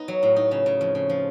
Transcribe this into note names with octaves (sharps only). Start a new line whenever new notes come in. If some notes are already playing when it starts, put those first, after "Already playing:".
Already playing: B3 D#4
F#3
A2
D#4
C#3
C#3
F2
C#3
F3